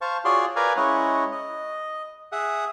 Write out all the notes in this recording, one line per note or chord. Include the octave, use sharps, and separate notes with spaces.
C5 F5 A5 C#6
F4 F#4 G#4 C#5 D5 C6
A#4 B4 D5 F5 G#5 A#5
G#3 C#4 E4 C#5 D#5 F#5
D#5
G#4 E5 F#5 D#6